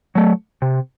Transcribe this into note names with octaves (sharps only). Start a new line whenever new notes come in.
F#3 A3
C3